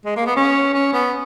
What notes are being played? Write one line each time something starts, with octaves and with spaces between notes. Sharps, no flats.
G#3
A#3
B3
C#4
C#4
B3